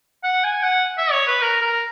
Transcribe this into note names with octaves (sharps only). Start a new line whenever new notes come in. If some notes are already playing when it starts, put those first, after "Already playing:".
F#5
G#5
F#5
E5
C#5
B4
A#4
A#4